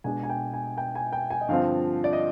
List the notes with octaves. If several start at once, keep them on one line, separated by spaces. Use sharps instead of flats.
B2 G#3 D4 G#5
G#5
G5
G#5
G5
G#5
G5
G#5
D#5
G2 D3 F3 C4 F4 F5
D5
D#5